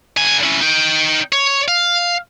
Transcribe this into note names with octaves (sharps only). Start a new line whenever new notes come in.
D3 G#5
C#4 E4
D#4 G5
C#5
F5